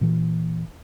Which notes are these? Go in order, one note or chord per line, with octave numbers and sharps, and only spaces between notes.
A#2 E3